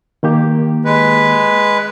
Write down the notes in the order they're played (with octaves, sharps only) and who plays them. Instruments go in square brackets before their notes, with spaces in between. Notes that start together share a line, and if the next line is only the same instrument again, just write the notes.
[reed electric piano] D#3 A#3 G4
[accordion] G#3 B4